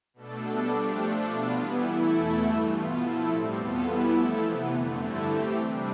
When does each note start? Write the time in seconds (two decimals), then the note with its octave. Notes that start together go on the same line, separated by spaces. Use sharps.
0.14 B2 A3 D4 A4
0.42 B2 G3 D4 A4
0.70 F3 A3 D4 G4
0.99 F3 A3 D4 A4
1.27 B2 B3 D4 F4
1.56 E3 G3 B3 E4
1.84 E3 A3 E4 A4
2.12 E2 B2 A3 E4 A4
2.41 G2 E3 A3
2.70 B2 B3 F4
2.98 F3 A3 E4 A4
3.26 A2 G3 C4
3.54 E2 B2 B3 F4 A4
3.82 E3 G3 B3 E4
4.11 F3 A3 E4 A4
4.40 C3 E3 B3
4.68 F2 D3 A3
4.97 G2 D3 A3 E4 A4
5.24 E3 A3 C4 G4
5.54 C3 G3 D4